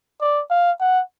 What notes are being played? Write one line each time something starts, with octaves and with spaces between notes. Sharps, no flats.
D5
F5
F#5